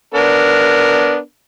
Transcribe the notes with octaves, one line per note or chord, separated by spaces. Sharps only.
B3 D4 A#4